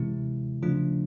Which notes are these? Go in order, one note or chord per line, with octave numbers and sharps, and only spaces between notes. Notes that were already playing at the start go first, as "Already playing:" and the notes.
Already playing: C3 E3 G#3 C4 E4
C#3 F3 A3 D4 F4